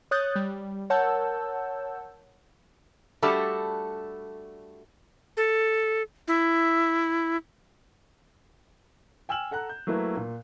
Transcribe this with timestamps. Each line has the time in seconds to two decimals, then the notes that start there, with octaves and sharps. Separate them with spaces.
0.11 C#5 D#6 F#6 G6 A6
0.36 G3
0.90 A#4 C#5 F#5 A5 E6 G6
3.22 G3 A3 D4 F#4 G4 A4
5.37 A4
6.28 E4
9.29 G5 G#5 E6 F6 E7 F#7
9.51 A4 F#5 A#5 F#6
9.69 G6
9.87 F#3 A3 A#3 E4 B4
10.17 A#2